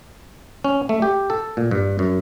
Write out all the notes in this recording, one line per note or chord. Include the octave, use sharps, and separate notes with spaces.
C#4
A3
G4
A4
A#2
G2
F#2